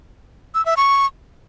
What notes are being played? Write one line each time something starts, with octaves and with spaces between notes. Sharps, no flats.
E6
E5
C#6